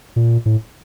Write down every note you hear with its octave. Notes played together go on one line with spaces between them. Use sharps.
A#2
A2